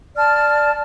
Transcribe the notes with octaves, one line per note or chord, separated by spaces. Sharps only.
D5 A5 F6